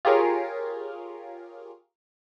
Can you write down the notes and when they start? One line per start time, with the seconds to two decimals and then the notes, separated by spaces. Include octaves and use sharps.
0.05 F4 G4 G#4 A#4 C#5 F5